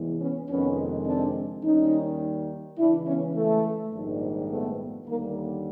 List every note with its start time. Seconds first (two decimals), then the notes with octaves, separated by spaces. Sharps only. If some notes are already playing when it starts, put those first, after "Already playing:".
Already playing: E2 C3 E3 G#3
0.21 B3 C#4
0.49 F2 C3 D#3 G#3 B3 C#4
1.07 C4 D4
1.64 D#2 D#3 G3 C#4 D#4
2.79 C#2 C#3 E3 D4 E4
3.07 B3 C#4
3.36 A3
3.93 A#1 G#2 D#3 G3
4.51 A3 B3
5.07 D#2 D3 G3 A#3